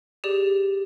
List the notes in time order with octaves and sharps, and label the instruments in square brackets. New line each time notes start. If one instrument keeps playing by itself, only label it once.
[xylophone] G4 G#4 D5